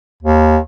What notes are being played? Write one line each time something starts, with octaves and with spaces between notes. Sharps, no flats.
D#2